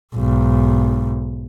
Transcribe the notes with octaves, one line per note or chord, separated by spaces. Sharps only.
B1 G#2